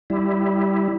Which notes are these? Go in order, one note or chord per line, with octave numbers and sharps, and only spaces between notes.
G3 E4